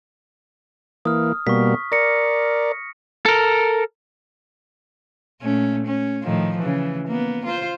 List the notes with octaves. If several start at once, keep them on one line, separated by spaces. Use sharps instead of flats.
E3 A#3 D#6 F6
B2 G3 A#3 C#6 B6
A#4 D5 A#6 C#7
A4 A#4
A#2 A3 C#4
C#4
A2 D#3 F3
C#3 E3
A#3 B3
F4 C5